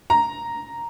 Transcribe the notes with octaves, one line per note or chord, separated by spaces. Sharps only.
A#5